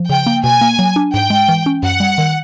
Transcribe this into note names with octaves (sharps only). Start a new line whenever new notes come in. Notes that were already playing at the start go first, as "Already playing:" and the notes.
Already playing: F3
C#3 G5
A#3
B2 G#5
A#3
F#3
D4
G#2 G5
G#3
E3
C#4
F#2 F#5
G3
D#3